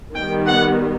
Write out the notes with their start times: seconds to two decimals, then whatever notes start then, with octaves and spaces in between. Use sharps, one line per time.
0.15 D#3 G3 B3 G5
0.47 F#5